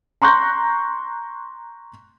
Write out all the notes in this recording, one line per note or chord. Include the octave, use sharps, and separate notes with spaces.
A#5 C6 C#6 F#6 G6 A#6